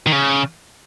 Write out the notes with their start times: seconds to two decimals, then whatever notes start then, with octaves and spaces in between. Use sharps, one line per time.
0.07 D#3
0.12 C#3